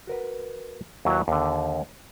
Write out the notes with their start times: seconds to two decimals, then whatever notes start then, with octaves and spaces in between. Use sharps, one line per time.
0.07 F#4 A#4 B4
1.05 D#2 F#3 E4 F#4 B4
1.28 D#2 D3